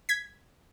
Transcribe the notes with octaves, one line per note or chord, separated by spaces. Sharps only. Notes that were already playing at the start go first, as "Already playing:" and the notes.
G#6 B6